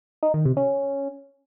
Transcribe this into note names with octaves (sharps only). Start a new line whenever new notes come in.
D#4
D#3
C3
C#4